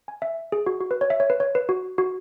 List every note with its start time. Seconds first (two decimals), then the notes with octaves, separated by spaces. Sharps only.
0.08 G#5
0.22 E5
0.52 G#4
0.66 F#4
0.81 F#4
0.91 B4
1.01 C#5
1.10 E5
1.20 C#5
1.30 B4
1.40 C#5
1.55 B4
1.69 F#4
1.98 F#4